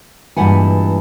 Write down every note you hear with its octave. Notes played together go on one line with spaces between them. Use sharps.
G2 A#2 E3 G#3 F#5 G#5